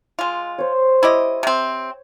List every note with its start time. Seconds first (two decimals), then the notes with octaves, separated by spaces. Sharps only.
0.19 G#3 F4
0.58 C5 C#5
1.03 E4 G4 D#5
1.43 C3 C4